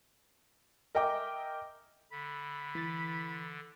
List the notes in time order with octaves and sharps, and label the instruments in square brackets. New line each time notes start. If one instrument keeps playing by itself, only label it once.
[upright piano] A#4 D#5 E5 G5 G#5 D6
[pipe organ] D3 [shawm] B5
[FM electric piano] E3 A6